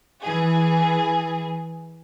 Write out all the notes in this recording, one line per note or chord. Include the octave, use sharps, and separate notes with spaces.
E3 G#4